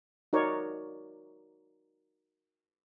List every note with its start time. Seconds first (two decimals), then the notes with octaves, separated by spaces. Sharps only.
0.33 D#4 F#4 A#4 C#5 D5